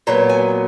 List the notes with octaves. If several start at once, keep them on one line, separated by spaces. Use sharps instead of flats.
A#2 F#3 B3 A#5
G#5